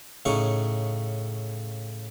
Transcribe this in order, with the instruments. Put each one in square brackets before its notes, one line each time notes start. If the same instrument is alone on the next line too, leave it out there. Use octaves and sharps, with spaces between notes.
[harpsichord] A2 C#3 D#4 C#6